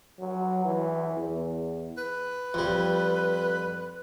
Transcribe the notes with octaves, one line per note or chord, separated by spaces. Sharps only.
F#3
E3
E2
B4
F2 G3